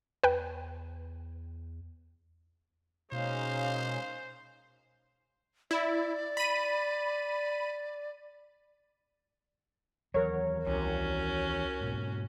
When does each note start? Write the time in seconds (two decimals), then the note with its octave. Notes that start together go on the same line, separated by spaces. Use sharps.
0.24 E2 B4 G5
3.12 B2 G#3 A#3 C#4 D#4 C5 F5
5.71 E4 D5
6.37 B5 D#7
10.14 D#2 E3 F#3 A#4 C#5
10.67 C2 C#4 F#4
11.81 G#2 B2